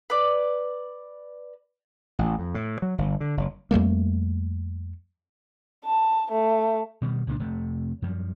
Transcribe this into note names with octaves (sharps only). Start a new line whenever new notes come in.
B4 D5
A1
F2
A2
F#3
G1
D3
F#1
F2 G3 A3 A#3
A5
A3
B2 D#3 G3
C#2 A#2 C#3 D4
F1 C3 A3
F#2 F3 G3